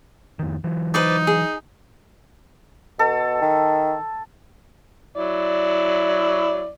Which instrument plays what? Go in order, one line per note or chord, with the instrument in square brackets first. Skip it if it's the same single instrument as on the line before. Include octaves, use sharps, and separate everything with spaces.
[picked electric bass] F2 D#3
E3 F#3
[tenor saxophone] D#4 [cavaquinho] B4 C5 D5
[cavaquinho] G#4
[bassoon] B2 [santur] A4
[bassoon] D#3
[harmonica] F#3 E4 D5